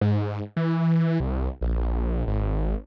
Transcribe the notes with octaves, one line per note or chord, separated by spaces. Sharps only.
G#2
E3
C2
A#1
G#1